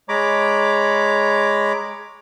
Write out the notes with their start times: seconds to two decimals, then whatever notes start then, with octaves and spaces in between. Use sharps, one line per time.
0.09 G#3 C#5 A#5 B5 D6